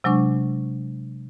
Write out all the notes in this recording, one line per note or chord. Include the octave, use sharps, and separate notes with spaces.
C3 F#3 G#3 D4 C#6